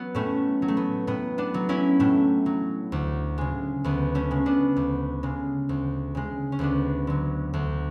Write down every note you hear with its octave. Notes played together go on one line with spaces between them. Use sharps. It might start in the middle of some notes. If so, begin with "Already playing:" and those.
Already playing: F#3 B3
A2 A3 C#4
F#3
A3
B3
A2 B3
B3 D4
F#3
C#4 E4
A2 A3
F#3
D2
C#3 G#3
D2 B3
A3 C#4
C#3 G#3
B3 D4
D2
C#3 G#3
D2
C#3 G#3
C#4
D2 B3 D4
D3 F#3
D2